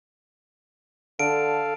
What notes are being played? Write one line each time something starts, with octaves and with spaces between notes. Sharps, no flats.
D3 A4 F5 D7